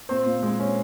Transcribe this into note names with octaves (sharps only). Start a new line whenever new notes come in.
A#2 C4 C5
A#2
G#3
C#4